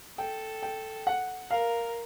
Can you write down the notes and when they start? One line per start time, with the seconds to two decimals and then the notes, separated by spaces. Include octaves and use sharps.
0.18 A4 G5
0.63 G5
1.07 F#5
1.51 A#4 F5